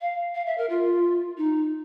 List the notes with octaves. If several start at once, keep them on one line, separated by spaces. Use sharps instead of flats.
F5
F5
E5
A#4
F4
D#4